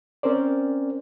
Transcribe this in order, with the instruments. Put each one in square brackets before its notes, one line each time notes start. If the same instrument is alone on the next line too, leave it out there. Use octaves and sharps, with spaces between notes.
[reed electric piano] C4 C#4 A#4 C5 D5